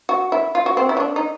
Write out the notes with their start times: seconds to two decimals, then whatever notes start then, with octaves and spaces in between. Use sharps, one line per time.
0.09 F#4
0.32 E4
0.55 F4
0.66 F#4
0.77 C4
0.89 E4
0.97 C#4
1.00 D4
1.16 D#4